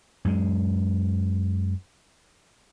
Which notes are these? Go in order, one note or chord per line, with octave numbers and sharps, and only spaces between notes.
F#2 G#3